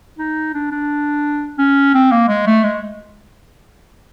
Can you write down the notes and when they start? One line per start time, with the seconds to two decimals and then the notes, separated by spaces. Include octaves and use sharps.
0.19 D#4
0.54 D4
0.71 D4
1.59 C#4
1.95 C4
2.12 A#3
2.28 G#3
2.47 A3
2.64 G#3